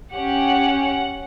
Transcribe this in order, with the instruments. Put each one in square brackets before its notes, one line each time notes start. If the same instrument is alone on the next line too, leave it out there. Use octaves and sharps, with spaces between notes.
[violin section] C#4 G4 F#5